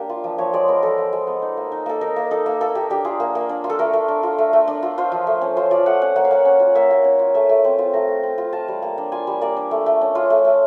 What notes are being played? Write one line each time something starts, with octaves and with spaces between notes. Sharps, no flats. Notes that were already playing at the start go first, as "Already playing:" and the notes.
Already playing: A#3 D4 G4
F4
F3
F3 C#5
G#3 D5
B3 A#4
F3 A4
F3
G#3
B3
D#4
A#3
D#4
A#3 A4
D#4 A#4
A#3
D#4 A4
A#3
A#3 A4
A#3 G4
D4 G4
F4 G#4
A#3
A#3
D4
F4
A4
A3 A#4
A3
D4
F4
A3
A3
D4
F4
F4 C5
F3
A3
C#4
F4 C5
F3 D5
A3 F#5
C#4 F#5
A#3 F#5
F5
A#3 F#5
C#4
F4
A#3 E5
A#3
C#4
F4
A3 E5
A3
C4
F4
A3 A#5
A3
C4
F4
F4 A5
G3
A#3
D4
F4 G#5
G3
A#3 D5
D4
A3
A3
C#4
F4
A3
A3